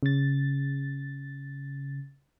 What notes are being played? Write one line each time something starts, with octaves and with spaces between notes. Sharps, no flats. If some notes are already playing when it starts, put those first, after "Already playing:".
C#3 A6